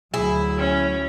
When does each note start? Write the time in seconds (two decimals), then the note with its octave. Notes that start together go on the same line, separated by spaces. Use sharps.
0.14 D2 F#3 E4 G#4
0.57 C#4